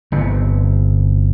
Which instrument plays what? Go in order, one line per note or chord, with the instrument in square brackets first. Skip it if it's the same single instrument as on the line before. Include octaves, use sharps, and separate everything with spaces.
[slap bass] G1 C3